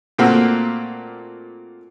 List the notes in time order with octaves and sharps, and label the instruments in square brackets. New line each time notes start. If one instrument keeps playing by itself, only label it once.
[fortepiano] A#2 A3 A#3 C4 F#4